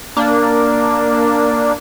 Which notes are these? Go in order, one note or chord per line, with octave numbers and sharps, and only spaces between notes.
A#3 D4